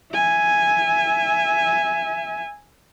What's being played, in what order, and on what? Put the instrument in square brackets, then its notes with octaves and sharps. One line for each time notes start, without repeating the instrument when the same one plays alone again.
[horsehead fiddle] E5 G#5